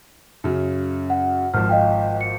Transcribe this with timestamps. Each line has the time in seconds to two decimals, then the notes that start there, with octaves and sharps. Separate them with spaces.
0.44 F#2 C#3
1.10 F#5
1.54 G#1 F3 F6
1.69 D#5 F5 G5
2.21 C#7